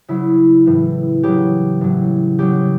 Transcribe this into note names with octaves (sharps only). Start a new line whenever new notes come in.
C#3 F#3 E4
A2 E3
C#3 F#3 G4
A2 F#3
C#3 F#3 G4